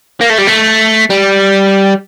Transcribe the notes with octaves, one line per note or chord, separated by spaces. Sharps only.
A#3
A3
G3
A3
G3